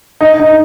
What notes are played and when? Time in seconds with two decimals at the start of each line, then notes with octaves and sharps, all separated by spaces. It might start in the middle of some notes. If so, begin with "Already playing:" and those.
0.21 D#4
0.40 D#4